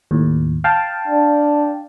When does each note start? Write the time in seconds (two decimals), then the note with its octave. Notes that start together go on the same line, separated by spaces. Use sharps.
0.11 D#2 A2
0.64 F5 G5 A5
1.08 D4